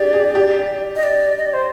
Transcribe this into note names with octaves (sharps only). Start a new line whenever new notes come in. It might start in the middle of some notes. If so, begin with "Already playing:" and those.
Already playing: G4 G#4 D5
G#4
G4
D#5
D5
D#5
D5
C5